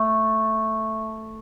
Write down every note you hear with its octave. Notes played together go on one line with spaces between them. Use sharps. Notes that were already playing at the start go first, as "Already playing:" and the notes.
Already playing: A3